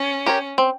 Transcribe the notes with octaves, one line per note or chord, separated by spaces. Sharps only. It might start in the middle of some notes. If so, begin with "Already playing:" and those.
Already playing: C#4
G4 A#4 C#5
C4